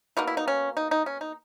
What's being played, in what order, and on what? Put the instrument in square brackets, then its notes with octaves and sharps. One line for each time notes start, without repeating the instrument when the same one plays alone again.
[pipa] B2 A#3 D#4
E4
D#4
C#4
D#4
D#4
C#4
D#4